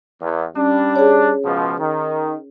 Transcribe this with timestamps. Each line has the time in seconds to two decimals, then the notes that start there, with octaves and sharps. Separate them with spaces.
0.21 E2
0.56 G3 C#4 D4
0.96 G#4 C#5
1.45 C#2 B2 F3
1.78 D#3